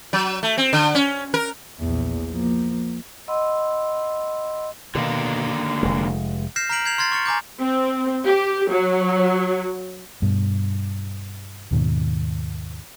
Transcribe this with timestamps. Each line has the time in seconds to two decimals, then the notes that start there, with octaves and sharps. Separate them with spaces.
0.13 F#3
0.43 A3
0.58 C4
0.73 D3
0.95 C#4
1.34 A#4
1.80 A#1 E2
2.30 F3 A#3
3.28 D#5 F#5 B5 C6 E6
4.95 B2 D3 D#3 A#3
5.83 F1 G#3
6.56 F6 G6 A#6 C7 E7
6.70 A#5 F6 G6 B6 D7 F#7
6.86 G6 G#6 C7 F7 F#7
6.98 C6 F6 G#6 A6 C7
7.12 C#6 F6 A6 C#7
7.26 G#5 A#5 D6 G6
7.60 C4
8.25 G4
8.70 F#3
10.22 G2 B2
11.71 D#2 G#2 B2 D#3